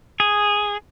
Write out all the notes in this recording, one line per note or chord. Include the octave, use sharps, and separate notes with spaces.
G#4